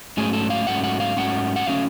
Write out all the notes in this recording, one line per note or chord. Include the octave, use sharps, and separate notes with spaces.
G#2 F#3 A3 C#4 G#4
A4
F5
G#2 F#3 A3 C#4 F#5
F#5
F5
G#2 F#3 A3 C#4 F#5
F#5
F#3 A3 C#4 F5